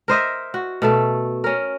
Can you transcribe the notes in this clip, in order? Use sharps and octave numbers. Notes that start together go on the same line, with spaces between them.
A#4 C5 D#5 E5
F#4
B2 A3 A4
C#4 A#4